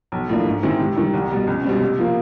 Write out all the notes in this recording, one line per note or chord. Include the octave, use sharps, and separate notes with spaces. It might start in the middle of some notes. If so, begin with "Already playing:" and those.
B1
A2 F3 A#3 D4
G#2
D#3 G#3 C4 E4
C3
D#3 G3
C2
B2 G3
C#2
B2 G3 C4
C3
F3 A#3